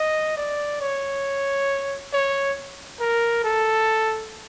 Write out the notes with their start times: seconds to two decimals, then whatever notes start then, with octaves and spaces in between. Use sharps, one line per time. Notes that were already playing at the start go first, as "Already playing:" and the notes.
Already playing: D#5
0.37 D5
0.81 C#5
2.13 C#5
3.00 A#4
3.44 A4